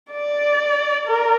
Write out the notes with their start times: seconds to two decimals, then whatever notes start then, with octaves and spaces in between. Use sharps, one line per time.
0.11 D5
1.07 A#4